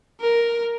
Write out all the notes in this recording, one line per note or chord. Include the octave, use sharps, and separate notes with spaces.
A#4